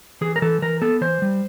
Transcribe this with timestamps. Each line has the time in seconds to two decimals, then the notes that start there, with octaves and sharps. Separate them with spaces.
0.21 E3 G#4
0.36 A#4
0.42 E3 A4
0.62 E3 A#4
0.82 B3 A4
1.01 E3 C5
1.22 G3